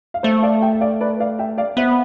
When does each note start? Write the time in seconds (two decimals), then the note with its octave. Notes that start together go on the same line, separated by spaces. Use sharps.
0.14 F5
0.23 A3 C5 E5
0.42 D5 F5
0.62 E5 G5
0.72 E5
0.81 D5 F5
1.01 B4 D5
1.20 D5 F5
1.39 E5 G5
1.58 D5 F5
1.77 B3 C5 E5